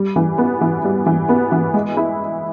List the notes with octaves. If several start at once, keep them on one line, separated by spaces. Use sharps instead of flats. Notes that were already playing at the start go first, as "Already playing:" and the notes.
Already playing: G3
E3
B3
E3
G3
E3
B3
E3
G#3
E4